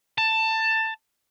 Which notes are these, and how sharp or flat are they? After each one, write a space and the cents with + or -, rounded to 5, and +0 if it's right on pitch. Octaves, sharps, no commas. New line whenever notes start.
A5 +15